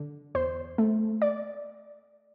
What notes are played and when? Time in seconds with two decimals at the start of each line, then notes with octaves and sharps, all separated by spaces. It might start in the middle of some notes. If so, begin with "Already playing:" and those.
Already playing: D3
0.35 E2 C5
0.78 A3
1.22 D5